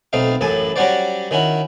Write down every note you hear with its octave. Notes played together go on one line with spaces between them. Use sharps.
B1 A3 C4 D#4 F5
A1 F#2 A2 G#5 A5
F#3 G3 C#4 F#4 C5 D5
D#3 C#4 E4 F#4